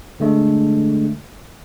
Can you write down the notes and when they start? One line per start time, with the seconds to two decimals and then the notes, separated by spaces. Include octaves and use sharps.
0.20 D3 G#3 A3 D4